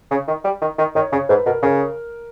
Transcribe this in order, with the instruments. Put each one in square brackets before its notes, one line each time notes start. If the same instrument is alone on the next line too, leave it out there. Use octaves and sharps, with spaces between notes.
[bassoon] C#3
D#3
G3
D#3
D#3
[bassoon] D#3 [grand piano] C#5
[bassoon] C#3 [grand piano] C#5
[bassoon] G#2 [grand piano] B4
[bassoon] B2 [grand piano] A#4
[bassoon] C#3 [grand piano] A#4